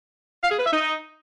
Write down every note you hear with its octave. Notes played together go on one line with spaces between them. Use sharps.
F5
G#4
B4
E5
D#4